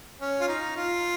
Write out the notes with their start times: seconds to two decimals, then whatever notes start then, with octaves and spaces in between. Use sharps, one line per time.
0.20 C#4
0.40 F4
0.48 D#4
0.76 F4